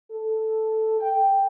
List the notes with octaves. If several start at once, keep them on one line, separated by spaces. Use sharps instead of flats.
A4
G5